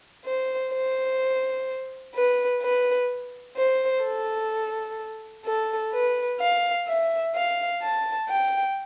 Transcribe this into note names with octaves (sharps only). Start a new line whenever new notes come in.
C5
C5
B4
B4
C5
A4
A4
B4
F5
E5
F5
A5
G5